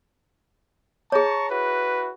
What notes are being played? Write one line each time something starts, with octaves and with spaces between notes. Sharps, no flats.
G#4 C#5 A5 A#5 C#6
E4 F#4 B4